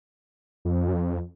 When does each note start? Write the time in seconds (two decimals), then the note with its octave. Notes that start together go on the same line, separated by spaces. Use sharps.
0.65 F2
0.88 F#2
0.93 F2